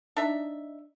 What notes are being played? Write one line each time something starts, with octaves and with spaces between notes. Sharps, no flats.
D4 D#4 E5